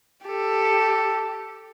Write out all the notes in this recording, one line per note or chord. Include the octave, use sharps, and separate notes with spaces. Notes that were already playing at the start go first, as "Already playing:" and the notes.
G4 A4